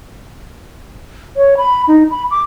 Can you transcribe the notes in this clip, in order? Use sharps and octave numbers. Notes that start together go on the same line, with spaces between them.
C#5
B5
D#4
B5
D6